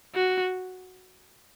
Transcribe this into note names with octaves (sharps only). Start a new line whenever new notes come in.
F#4